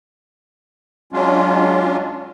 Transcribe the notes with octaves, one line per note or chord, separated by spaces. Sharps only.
F#3 G#3 C#4 D4 F4